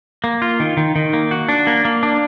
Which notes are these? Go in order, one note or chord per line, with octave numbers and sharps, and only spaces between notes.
A#3
F4
D#3
D#3
D#3
A#3
F#4
D4
A#3
A#3
D4